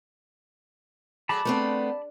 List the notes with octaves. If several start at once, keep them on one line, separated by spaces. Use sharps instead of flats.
F#3 A3 G#4 A5 B5 D6
A3 B3 C4 D4